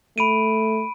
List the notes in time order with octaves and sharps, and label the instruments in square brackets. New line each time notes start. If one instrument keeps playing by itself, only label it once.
[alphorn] A3 [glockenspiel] B5 D7 D#7